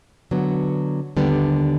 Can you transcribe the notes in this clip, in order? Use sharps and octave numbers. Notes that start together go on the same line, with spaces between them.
D3 F#3 B3
D#2 D3 G3 B3